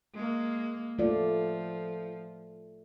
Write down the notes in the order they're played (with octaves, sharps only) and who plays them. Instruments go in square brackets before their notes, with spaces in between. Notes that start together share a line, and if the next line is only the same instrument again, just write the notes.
[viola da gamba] G#3 A#3
[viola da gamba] F3 [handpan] A3 F4 D5